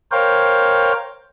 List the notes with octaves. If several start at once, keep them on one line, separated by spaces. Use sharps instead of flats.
A#4 C5 C#5 F5 G5